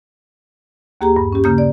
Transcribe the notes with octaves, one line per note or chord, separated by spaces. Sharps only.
D#2 A#3 G4 G#4 A#5
G2
C#4 G4
C#3 A#3 D#6 G6
D5